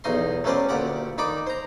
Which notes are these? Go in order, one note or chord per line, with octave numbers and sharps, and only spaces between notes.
B1 E2 D#4 D#5 C6
F#3 A3 C#4 B4 C5 D5
D2 A#2 G4 D5 F#5
D#3 D#4 D5 B5 D6
C5 A#5